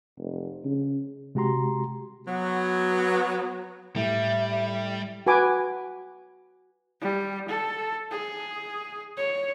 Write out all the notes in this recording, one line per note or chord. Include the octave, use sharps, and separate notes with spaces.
F1
C#3
C3 G#3 F#4 G4 A#5 C6
F#3 B3
A2 G3 E5
F#4 B4 G#5 D6
G3
A4
G#4
C#5